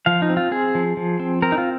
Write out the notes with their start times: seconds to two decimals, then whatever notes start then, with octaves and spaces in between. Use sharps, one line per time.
0.06 F3 F5
0.22 D#4
0.30 C4
0.37 F4
0.51 C4 G#4
0.75 F3
0.97 F3
1.20 C4
1.42 C4 A#4
1.52 D#4
1.58 F4